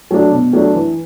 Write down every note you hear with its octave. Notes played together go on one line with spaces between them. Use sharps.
F#3 A3 D4
B2
F#3 A3 D4
E3